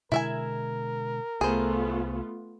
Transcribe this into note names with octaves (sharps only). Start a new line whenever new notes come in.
B2 D3 G#3 E4 A#4 E5 G#5
C2 A3 B3 F4 G#4 C5